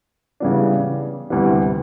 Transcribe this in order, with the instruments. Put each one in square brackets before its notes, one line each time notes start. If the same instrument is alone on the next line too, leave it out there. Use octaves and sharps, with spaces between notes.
[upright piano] C#3 E3 G3 B3 D4
D2 C3 E3 G3 B3